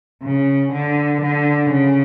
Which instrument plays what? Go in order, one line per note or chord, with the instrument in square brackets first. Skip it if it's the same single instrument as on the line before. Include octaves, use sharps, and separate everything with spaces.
[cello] C#3
D3
D3
C#3